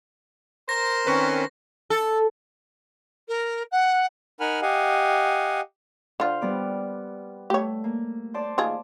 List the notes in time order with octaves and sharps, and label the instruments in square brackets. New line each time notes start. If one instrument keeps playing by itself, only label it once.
[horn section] A#4 C5 [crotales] A#6
[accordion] D#3 C4 C#4 [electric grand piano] B4 C#6
[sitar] A4
[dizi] A#4
F#5
[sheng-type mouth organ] D#4 A#4 F#5 G#5 B5 F6
G4 D#5 F5 F#5 G#5
[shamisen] D3 F4 [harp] C5 F6
[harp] G3 B3 D5
[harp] A3 [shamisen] G4 C#5
[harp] A#3
C5 D5 A5
[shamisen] D#3 F4 G#4